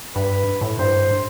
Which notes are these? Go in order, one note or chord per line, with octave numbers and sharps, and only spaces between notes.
G2 B4
A2
G2 C5